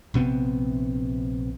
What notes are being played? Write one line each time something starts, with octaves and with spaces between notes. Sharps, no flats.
A#1 C3 B3 C4